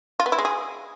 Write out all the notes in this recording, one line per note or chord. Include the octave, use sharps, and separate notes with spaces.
F4
B3
E4
G#3
G#4